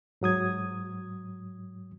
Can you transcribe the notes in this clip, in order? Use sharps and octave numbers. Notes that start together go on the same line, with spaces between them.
G#2 F#3 D#6 G#6